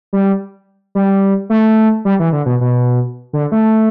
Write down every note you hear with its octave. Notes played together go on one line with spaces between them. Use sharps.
G3
G3
A3
G3
E3
D3
B2
B2
D3
A3